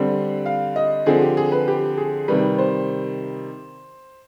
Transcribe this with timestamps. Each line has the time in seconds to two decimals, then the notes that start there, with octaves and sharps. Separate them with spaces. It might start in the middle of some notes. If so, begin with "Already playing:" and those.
Already playing: D3 G3 C4
0.46 F5
0.76 D#5
1.06 D3 F3 C4 G#4
1.22 G4
1.37 G#4
1.52 B4
1.68 G4
1.97 G#4
2.28 C3 D#3 G3 B4
2.58 C5